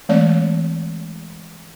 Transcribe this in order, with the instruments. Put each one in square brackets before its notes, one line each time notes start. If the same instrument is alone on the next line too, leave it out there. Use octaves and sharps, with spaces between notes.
[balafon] E3 G#3 A3 C4 C#5 D5